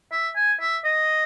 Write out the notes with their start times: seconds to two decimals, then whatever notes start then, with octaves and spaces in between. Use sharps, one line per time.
0.12 E5
0.36 G#5
0.60 E5
0.84 D#5